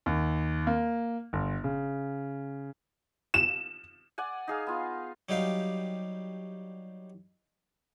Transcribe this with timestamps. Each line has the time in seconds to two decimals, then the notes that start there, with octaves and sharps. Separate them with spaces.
0.06 D#2
0.67 A#3
1.33 G1
1.64 C#3
3.34 E7
4.18 D5 F#5 G#5
4.48 D#4 G#4 F5
4.67 B3 F4
5.29 F#3 G3 D#4 G4 F5